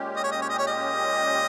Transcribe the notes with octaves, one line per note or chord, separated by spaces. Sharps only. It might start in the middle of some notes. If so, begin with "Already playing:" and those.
Already playing: A#2 G#3 C#4 G4
D#5
C#5
D#5
C#5
D#5
C#5
D#5